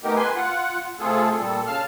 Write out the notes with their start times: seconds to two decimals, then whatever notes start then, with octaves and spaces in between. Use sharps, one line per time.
0.04 A3 B3 D#4 G4 A#4
0.16 B4 G#5 C6
0.35 F4 F#5
0.99 C3 A3 F4 G#4 A4
1.38 A#2 G3 A4
1.67 C#3 F5 A5 F6